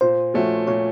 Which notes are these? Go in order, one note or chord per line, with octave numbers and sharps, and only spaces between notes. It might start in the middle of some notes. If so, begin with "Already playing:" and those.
A#2 C5
F3 A3 C#4 F#4
A#2 C#5